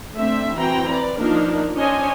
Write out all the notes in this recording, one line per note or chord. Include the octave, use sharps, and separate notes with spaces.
A3 C4 D4 E5
E3 C4 F#4 G5 A#5
B4 D5
F3 A#3 D4 D#4 A#4
C#4 D4 C5 C#5 D#5 G#5